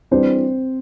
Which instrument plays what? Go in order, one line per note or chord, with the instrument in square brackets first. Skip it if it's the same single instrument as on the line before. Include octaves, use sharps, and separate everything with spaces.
[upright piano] E3 G3 D4 [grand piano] C4 C5